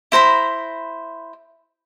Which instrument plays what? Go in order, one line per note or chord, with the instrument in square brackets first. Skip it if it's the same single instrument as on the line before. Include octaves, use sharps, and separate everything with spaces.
[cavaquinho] E4 C5 A#5 B5